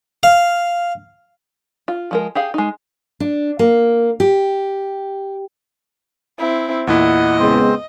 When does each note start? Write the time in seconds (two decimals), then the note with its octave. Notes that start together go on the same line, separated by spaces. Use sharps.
0.23 F5
1.88 F4
2.11 F3 G#3 A#4
2.35 G4 G#4 F5
2.54 G#3 D#4
3.20 D4
3.59 A#3
4.20 G4
6.38 C4 E4
6.87 E2 A#2 E4 D#5 F#5
7.39 C#3 G#3 B3 C4 C5